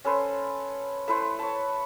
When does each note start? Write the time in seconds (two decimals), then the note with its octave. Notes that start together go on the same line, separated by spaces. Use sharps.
0.05 C#4 A4 B4 C5
1.08 A3 E4 B4 C5
1.39 C#5 A5